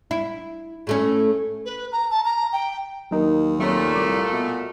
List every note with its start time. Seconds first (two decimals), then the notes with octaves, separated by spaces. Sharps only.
0.11 E4
0.87 A2 A3 C#4
1.65 B4
1.92 A#5
2.11 A5
2.25 A#5
2.52 G5
3.11 D#2 F#3 D#4 A#4
3.60 A#2 F#3 A3 C4 C#5
3.95 C2 D6
4.33 B2